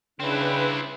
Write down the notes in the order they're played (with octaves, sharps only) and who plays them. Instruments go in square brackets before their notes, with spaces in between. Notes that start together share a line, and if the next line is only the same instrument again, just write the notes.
[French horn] C#3 [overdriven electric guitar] C4 E4 [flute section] D4 B4